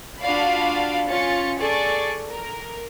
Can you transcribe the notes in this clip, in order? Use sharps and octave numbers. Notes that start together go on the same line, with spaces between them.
D4 F4 F#4 D5 F5 B5
C#4 F4 A6 C#7
G#4 A4 D5 C#6 A6
A#4